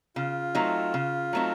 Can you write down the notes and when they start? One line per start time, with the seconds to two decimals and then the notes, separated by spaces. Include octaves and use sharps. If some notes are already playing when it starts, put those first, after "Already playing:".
0.16 C#3 F4
0.55 F#3 A3 C4 D#4
0.94 C#3
1.33 F#3 A3 C4 D#4